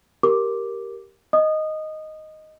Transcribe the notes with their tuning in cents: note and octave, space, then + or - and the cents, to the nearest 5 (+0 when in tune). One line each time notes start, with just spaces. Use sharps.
G4 -5 A#4 +0 D6 +0
D#5 +0 D#6 -20